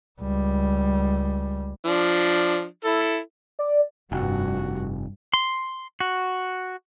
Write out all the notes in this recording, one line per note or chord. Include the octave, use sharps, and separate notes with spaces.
C#2 G3
F3 D4
E4 A4
D5
F1 G2 F#4
C6
F#4